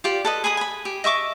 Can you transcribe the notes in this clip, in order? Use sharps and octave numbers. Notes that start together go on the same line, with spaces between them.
F4 G4 D5
A4 B4 D#5
G#4 G#5 B5 D#6
G#5 B5
G4
D#5 E5 C#6 D6